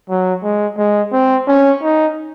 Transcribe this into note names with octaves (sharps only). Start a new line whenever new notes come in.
F#3
G#3
G#3
C4
C#4
D#4